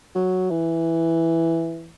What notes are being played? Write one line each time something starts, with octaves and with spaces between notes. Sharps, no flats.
F#3
E3